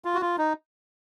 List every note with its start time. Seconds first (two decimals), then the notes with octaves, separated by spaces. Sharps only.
0.05 F4
0.15 F#4
0.21 F4
0.38 D#4